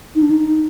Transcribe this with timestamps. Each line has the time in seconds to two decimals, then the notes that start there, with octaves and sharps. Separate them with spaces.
0.15 D#4
0.22 D4
0.30 D#4